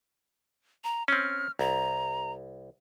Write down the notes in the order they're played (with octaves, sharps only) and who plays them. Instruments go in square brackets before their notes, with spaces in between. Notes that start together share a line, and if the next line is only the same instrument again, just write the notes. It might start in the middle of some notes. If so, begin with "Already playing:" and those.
[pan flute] A#5
[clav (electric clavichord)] C4 C#4 [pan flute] F6
[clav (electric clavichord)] C2 [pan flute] A#5